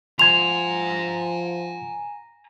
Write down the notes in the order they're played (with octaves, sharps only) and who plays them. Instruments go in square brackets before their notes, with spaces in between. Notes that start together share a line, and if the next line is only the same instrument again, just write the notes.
[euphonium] F3 [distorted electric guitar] G#5 A#5 [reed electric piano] C6 G#6 [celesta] F7